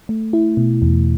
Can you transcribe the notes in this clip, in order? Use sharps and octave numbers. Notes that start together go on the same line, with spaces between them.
A3
E4
B2
E2